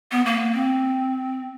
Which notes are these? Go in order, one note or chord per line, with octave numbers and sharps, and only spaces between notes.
B3
A#3
C4